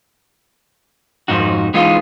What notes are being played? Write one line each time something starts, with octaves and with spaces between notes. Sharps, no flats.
F2 G#2 D#4 F#4
E3 G#3 D#4 F4